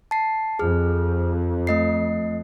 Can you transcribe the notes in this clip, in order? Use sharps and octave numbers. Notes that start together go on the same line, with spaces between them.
A5 C7
F2 G#4 F6
A3 D#5 C7